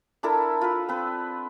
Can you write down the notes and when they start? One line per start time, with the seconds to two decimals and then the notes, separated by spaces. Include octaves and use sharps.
0.23 D4 E4 A4 A#4
0.61 F4 B4
0.89 C4 B4